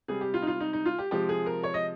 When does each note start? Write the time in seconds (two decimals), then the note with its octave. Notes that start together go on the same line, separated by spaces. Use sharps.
0.08 C3 G3 G#4
0.21 G4
0.34 F4
0.42 D#4
0.47 F4
0.60 D#4
0.73 D#4
0.86 F4
0.99 G4
1.11 C3 F3 G#3 G4
1.29 G#4
1.46 A#4
1.63 C#5
1.74 D#5